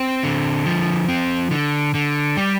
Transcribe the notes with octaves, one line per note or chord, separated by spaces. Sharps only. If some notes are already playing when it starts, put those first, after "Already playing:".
Already playing: C4
D3
F3
C4
D3
D3
G3